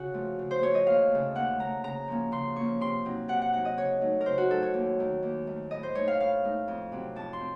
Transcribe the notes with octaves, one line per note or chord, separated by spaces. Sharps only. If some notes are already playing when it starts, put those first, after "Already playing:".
Already playing: C#3 F#4
F3 A3
C#3
C5
F3 A3 C#5
D#5
D#2 F5
C#3 A3
D#2 F#5
C#3 A3 A#5
C#3 A#5
F3 A#3 C#4
C#3 C6
F3 A#3 C#4 C#6
C3 C6
F#3 C4 D#4
C3 F#5
F#5
F#3 C4 D#4 F#5
D#5
C#3 C#5
F#3 A3 D#4
A#4
C#3 C5
F#4
F#3 A3 D#4 A4
C#5
D#2
D#3 A3
D#2
D#3 A3
A2 D#5
C5
A3 D#4 C#5
F5
A2 F5
A3 D#4
F2
C3 F#3 C4
F2 A5
C6
C4